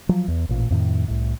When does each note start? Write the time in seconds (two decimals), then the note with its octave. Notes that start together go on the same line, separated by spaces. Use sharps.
0.09 F3 F#3
0.28 E2
0.49 A1 A#2
0.70 F2 A2 D#3
1.08 C2 A2